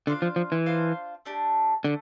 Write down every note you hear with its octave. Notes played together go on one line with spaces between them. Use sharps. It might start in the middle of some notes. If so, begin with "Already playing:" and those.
D3 D4 F4 C5 F5
F3
F3
E3
D4 F4 C5 F5
A3 D4 G4
D3 A3